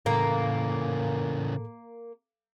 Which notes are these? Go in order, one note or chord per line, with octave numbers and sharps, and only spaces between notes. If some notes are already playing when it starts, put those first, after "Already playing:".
A2 C#3 E3 A#3 A4